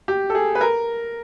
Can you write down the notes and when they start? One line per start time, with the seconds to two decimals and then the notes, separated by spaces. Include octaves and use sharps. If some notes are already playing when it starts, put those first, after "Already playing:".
0.08 G4
0.30 A4
0.35 G#4
0.55 B4
0.61 A#4